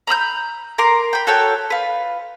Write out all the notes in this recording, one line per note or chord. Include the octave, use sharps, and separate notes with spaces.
A#5 B5 E6 G6
A#4 A#5 C6 D6
G5 B5
F#4 A4 C#5 G5
F4 B4